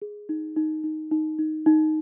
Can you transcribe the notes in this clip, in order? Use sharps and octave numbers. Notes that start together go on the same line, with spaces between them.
G#4
D#4
D#4
D#4
D#4
D#4
D#4